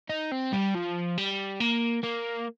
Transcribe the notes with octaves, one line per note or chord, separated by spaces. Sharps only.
D#4
C4
G3
F3
G3
A#3
A#3